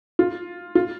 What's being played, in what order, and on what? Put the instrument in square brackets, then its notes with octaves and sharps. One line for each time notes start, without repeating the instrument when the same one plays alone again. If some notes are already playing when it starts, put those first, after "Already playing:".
[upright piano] F4
F4